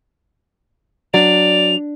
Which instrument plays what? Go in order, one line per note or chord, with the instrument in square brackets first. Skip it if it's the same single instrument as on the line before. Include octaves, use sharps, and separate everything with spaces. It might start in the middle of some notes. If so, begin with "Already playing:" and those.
[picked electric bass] F#3 [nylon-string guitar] D4 [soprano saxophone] D5 [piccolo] F7